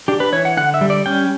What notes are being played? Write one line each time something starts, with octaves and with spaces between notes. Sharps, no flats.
D4 G4
B4
E3 C#5
F#5
D3 F#5
E5
G3
D5
C#4 G5